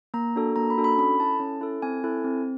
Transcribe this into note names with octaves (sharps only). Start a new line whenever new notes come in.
A#3 A#5
D4 F#4 A4
A#3 A#5
B5
D4 F#4 A4
B5
C#4 B5
E4 A4 A5
C#4
E4 A4
C4 G#5
E4 A4
C4